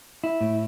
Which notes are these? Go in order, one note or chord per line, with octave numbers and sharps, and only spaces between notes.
E4
A2